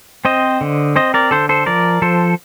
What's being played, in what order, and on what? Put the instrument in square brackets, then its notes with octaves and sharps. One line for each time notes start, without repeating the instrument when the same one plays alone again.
[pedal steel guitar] C4 C5 D#5
D3
C4 C5 D#5
A#4 D5
D3 A4 C5
A4 C5
F3 A#4 D5
F3 A4 C5